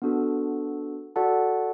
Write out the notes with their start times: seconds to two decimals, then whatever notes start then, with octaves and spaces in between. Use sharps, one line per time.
0.02 B3 D4 F#4 A4
1.16 F#4 A4 D5 F#5 A5